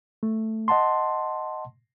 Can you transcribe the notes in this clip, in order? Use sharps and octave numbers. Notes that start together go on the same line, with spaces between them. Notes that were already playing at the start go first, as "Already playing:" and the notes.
A3
D#5 F#5 A5 C6